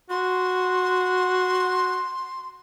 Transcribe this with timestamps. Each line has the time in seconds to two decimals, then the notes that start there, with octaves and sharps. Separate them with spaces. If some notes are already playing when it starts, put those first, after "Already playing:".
0.10 F#4 C6